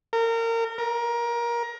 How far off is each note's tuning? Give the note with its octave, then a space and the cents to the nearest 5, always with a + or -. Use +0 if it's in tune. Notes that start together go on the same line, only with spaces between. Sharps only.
A#4 -25
A#4 +25